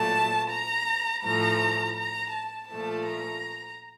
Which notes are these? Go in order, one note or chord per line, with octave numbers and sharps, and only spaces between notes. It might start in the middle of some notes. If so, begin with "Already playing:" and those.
Already playing: A#2 F#3 A3 A5
A#5
A2 F3 A3 A#5
A#5
A5
A#2 F3 A3 A5
A#5